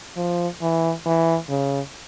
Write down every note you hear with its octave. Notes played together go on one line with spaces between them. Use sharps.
F3
E3
E3
C#3